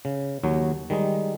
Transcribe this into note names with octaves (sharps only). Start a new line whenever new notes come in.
C#3
D#2 F#3
D#3 G3 G#3 D#4